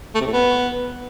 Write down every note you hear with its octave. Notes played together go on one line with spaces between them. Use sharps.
A3
C3
A2
B3